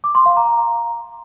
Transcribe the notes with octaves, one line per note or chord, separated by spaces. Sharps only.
D6
C6
F5
A#5